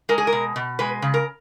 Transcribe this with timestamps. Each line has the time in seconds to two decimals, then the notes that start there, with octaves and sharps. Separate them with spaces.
0.09 G#3 A#4
0.18 G#4
0.27 A#4
0.33 B2
0.56 B2
0.79 G#3 B4
1.02 C#3
1.14 A#4